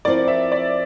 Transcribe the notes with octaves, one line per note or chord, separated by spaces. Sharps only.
F3 C4 E4 A#4 D5
E5
D5